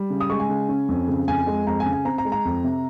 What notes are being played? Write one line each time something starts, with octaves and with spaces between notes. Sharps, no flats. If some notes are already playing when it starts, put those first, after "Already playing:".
Already playing: G3
C#3
D#6
G#3 C#6
G#5
C#3
C#4
F2
C#3
F2 G#5
G#3
F2 A#5
G#5
C#3
G#5
C4 A#5
A#5
G#3
A#5
F2
C3